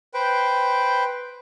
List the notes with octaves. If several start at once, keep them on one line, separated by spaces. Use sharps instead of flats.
B4 C5 G5